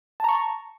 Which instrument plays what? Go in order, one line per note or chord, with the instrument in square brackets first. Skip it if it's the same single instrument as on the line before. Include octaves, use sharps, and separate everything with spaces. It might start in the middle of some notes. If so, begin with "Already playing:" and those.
[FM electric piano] A5
A#5
C#6